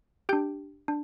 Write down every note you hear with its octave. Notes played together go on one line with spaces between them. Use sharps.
D4 G4 G5 G6
D4